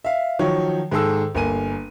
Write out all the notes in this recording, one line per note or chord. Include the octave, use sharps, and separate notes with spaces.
E5 F5
D#3 F3 F#3 C#5
G#2 D#3 G#4 A4 E6
G1 A#3 G#5 D#7